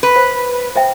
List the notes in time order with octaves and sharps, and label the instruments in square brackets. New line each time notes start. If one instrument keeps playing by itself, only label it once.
[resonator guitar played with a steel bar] B4
[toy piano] C5
C5 E5 G5